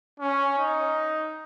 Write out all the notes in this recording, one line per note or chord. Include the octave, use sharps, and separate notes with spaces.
C#4
D#4